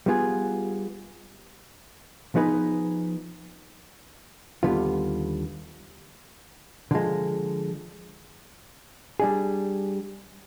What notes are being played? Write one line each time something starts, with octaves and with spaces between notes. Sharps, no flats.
G3 B3 F4 G#4
F3 B3 D#4 G#4 B4
D#2 D3 G3 B3 F4
D3 F3 G#3
G3 D4 G#4